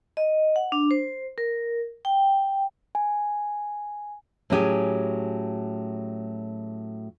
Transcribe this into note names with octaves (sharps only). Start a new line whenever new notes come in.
D#5
F#5
D4
C5
A#4
G5
G#5
A2 F#3 C#4 D4 G4 G#4